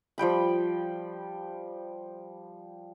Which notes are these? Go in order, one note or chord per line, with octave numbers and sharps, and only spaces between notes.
F3 G3 G5 B5